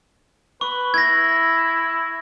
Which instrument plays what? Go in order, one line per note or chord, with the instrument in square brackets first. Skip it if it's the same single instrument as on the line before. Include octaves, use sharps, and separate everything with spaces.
[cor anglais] B4 [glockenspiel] C#6
[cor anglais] E4 [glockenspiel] G#6 A#6